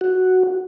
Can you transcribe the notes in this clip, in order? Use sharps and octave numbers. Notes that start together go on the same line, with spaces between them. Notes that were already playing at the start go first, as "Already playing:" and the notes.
F#4